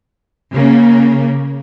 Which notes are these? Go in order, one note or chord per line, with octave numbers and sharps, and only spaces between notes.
C#3 A#3